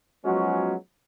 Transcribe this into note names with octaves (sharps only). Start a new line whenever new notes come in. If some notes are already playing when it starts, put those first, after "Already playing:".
F3 F#3 G#3 B3 C#4 F#4